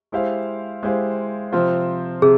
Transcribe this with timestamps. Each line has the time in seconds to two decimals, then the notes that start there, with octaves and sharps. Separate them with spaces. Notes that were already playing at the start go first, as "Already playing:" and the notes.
0.12 G#3 E4 G4 C5 F5
0.83 G#3 E4 G4 C5 F5
1.52 C3 F3 C4 F4 C5
2.22 C3 G#4